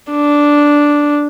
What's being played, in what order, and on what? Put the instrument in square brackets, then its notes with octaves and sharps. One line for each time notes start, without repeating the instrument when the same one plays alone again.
[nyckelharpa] D4